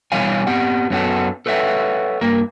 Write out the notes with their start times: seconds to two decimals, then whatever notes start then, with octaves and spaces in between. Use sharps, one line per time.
0.12 B2 E3 G3 C#5 F5 G#5
0.47 B3 C4 G4 F#5
0.90 F#2 B3 C#4 F#4 A4 F#5
1.46 A4 B4 C#5 E5 F#5
2.21 G2 A#3 A#4